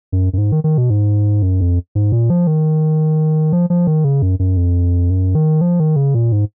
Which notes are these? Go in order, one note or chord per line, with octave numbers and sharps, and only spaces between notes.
F#2
F#2
G#2
D#3
D#3
B2
G#2
F#2
F2
G#2
A#2
F3
D#3
F3
F3
D#3
C#3
F#2
F#2
F2
F#2
D#3
F3
D#3
C#3
A#2
G#2